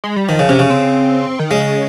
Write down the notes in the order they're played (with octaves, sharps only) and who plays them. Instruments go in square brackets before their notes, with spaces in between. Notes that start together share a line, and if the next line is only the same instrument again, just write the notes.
[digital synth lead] G#3
G3
[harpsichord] D#3 [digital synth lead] F3
[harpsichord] C#3
[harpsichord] C3 [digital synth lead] C#4
[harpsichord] C#3
[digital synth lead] C4
D#3
[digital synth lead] C#3 [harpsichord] G#3